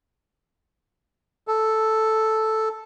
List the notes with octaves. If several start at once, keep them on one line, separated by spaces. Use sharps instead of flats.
A4